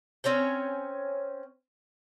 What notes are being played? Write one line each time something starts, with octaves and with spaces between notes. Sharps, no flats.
C4 C#4 C#5 G5